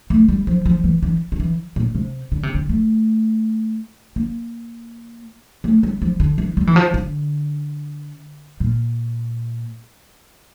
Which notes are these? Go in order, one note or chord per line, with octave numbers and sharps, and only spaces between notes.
A3
G3
F3
F3
E3
E3
D3
E3
A#2
C3
D3
C3
D3
A3
A#3
A3
G3
F3
D3
E3
G3
E3
F3
D3
A#2